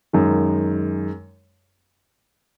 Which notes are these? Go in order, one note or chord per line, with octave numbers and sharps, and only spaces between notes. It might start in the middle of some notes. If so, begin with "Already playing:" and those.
F#2 D#3 G#3